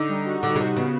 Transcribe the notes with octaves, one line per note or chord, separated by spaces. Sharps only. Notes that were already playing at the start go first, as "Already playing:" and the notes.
Already playing: D3 D#4
G3
F#4
D3 F#4
C#3
C3 F#4
C#3 B3